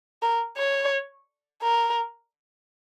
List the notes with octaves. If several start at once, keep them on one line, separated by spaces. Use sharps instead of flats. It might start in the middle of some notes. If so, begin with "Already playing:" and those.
A#4
C#5
A#4